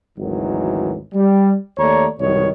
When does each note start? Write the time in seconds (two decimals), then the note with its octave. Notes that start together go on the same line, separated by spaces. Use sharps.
0.18 G#1 D2 D#3 E3 F#3
1.14 G3
1.78 D#2 A3 C#5 D5 A#5
2.19 C2 G#2 B2 D#3 C#5